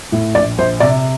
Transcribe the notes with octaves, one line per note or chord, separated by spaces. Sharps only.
A2
A#1 D5
A#1 C5
C3 D5